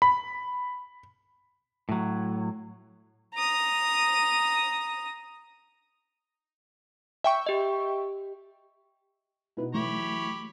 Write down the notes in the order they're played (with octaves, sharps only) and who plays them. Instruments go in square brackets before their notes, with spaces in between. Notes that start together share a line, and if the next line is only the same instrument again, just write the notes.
[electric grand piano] B5
[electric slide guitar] A2 F#3
[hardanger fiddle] A#5 D#6
[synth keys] E5 G5 C#6
[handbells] G4 D#5
[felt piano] B2 B3 D#4 [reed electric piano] E4 B4
[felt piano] E3 F#3 [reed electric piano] A3 [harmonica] G4 C#5 B5